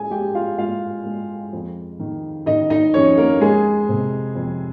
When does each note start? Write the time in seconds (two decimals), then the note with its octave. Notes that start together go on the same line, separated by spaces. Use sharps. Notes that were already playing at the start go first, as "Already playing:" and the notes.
Already playing: G#3 G#4 G#5
0.11 G#3 G4 G5
0.35 F4 F5
0.58 G#3 F4 F5
1.05 G#3
1.53 F2
2.00 D#3
2.46 D#3 D#4 D#5
2.70 D#4 D#5
2.94 F2 C#4 C#5
3.17 A#3 A#4
3.41 G#3 G#4
3.89 C3
4.35 F2